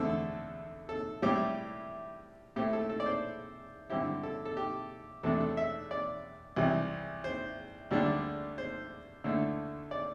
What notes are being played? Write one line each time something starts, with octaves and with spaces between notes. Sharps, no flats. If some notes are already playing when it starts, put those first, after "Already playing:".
Already playing: E2 D3 A3 C4 E4 A4
A4
A2 G3 C4 E4 G4
A2 A3 C4 E4 G4
A4
A4
D5
C5
G2 D3 C4 E4 G4
A4
A4
G4
E2 C3 A3 D4 A4
A4
E5
D5
C2 C3 E3 G3 E4
C5
D2 D3 G3 D4
C5
D2 D3 A3 E4
D5